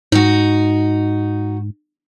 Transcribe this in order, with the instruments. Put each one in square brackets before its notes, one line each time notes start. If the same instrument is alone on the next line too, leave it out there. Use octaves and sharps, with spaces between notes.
[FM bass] G#2 [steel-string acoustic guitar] D#4 F#4